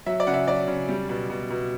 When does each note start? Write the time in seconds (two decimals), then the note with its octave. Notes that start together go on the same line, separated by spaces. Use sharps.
0.06 F#3 E5
0.20 D5
0.27 C#3 F#5
0.34 E5
0.47 F#3 D5
0.67 C#3
0.88 G3
1.09 B2
1.30 B2
1.50 B2